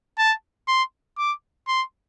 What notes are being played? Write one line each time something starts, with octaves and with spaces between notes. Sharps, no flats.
A5
C6
D6
C6